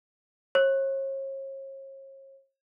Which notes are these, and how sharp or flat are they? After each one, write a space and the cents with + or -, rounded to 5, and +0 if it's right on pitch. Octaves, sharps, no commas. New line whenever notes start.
C#5 -40